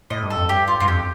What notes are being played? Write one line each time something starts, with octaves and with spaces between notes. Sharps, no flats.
A2 D#5
G2
A4
F2
G2 G4
F4
G2 F4
F2 G4